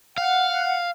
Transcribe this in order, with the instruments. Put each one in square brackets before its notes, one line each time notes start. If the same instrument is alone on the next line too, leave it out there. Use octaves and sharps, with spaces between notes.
[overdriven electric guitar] F5 [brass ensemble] F#5